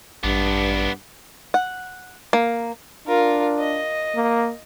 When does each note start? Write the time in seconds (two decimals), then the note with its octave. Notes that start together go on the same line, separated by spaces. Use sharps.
0.24 A1 G2 B3 D4
1.54 F#5
2.33 A#3
3.07 D4 F4 A#4
3.59 D#5
4.15 A#3